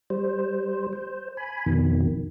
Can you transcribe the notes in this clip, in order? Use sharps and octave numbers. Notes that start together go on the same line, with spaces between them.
G3 C5
C5
G#5 B5
F2 B2 D#3